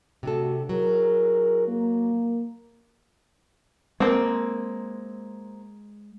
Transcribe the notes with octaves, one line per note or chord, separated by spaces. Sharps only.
C3 A3 D4 F#4 A4
F#3 E4 G#4 A#4
A#3
G#3 A#3 C4